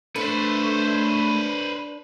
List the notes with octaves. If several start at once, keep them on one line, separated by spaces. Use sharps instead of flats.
A3 D4 B4 C5